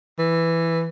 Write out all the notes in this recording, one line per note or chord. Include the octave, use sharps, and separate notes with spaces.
E3